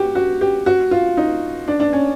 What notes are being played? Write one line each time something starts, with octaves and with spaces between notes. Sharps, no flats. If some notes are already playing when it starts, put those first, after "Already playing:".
Already playing: F#4 G4
F#4
G4
F#4
F4
D#4
D4
D4
C#4